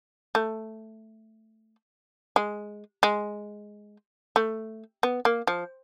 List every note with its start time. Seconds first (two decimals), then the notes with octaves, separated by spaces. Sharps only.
0.35 A3
2.36 G#3
3.03 G#3
4.36 A3
5.03 B3
5.25 A#3
5.47 F3